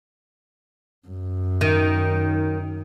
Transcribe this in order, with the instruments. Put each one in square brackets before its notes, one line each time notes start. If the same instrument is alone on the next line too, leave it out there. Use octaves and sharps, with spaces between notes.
[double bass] F#2
[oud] D#3